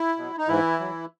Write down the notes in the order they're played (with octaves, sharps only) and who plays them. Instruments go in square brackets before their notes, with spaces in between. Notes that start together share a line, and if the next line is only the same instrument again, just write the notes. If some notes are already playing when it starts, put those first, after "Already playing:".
Already playing: [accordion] E4
B2 F#3
D#4
G#2 E3 E4
F#3